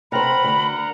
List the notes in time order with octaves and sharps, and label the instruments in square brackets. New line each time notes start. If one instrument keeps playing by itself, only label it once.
[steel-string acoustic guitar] C3 C5 [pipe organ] A#4 F#5 A#5 [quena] B5
[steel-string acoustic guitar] D2